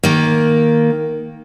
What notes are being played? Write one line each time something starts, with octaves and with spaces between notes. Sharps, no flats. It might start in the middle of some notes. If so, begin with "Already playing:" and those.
D#3 A#3